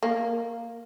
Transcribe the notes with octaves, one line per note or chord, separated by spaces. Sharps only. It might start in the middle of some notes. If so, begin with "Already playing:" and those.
A#3